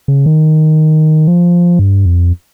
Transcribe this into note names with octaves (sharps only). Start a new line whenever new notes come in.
C#3
D#3
F3
G2
F2